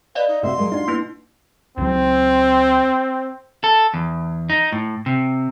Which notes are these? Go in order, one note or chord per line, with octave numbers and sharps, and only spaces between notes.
B4 D5 D#5 F5
D#4
A2 C3 F#4 A#4 E5 C6
F#3 G#3 A#4
D4 D#4 F4 F#4
A#3 B3 E4
C#2 F#3 C4
A4
E2
D#4
A2
C3